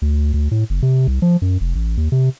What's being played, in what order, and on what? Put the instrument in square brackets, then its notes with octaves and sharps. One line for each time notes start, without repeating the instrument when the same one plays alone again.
[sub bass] D2
D2
A2
F#1
C3
C2
F3
F#2
F1
A1
D#2
C3